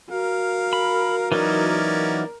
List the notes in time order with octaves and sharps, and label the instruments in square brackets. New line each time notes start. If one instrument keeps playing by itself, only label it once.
[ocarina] F#4 [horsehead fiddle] A#4 [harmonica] F5
[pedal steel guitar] B5
[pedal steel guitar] E3 F#3 D#4 [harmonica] A#3 C#4 D5